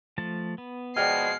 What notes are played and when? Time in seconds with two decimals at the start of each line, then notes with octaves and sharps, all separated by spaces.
0.18 F3 A3 A5
0.58 B3
0.97 B2 F3 G#3 D5 G5 F6 C7